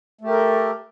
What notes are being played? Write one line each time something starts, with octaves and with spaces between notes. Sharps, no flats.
A3 G4 A4 A#4